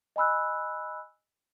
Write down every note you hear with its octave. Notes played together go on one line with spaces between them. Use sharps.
D#5 G#5 B5 E6 F#6